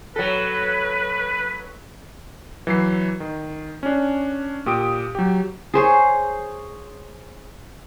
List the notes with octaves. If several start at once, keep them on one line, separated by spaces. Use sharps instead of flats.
F#3 A4 B4
E3 F#3 C7
D#3
C#4 D4
A#2 G4 D#6 D7
F#3 G4
G#4 C5 C#5